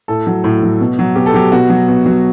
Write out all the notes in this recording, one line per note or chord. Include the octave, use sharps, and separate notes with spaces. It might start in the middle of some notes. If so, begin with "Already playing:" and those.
A2 A4
F#3
A2
F#3
B2
F#3
B2 G4
A4
F#3 G4
B2 F#4
F#3
B2
F#3